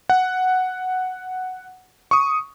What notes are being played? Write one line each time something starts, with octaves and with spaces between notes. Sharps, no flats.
F#5
C#6 D#6